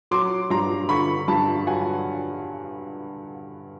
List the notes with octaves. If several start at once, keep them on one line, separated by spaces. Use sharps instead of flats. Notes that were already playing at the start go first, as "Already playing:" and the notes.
F#3 C6 D6
G2 A#5 C6
D3 B5 C#6
G2 A5 B5
F#3 F#5 G#5